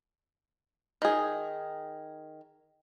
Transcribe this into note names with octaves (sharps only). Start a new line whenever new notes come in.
D#3 G#4